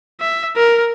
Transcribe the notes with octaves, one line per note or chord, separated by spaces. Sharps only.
E5
A#4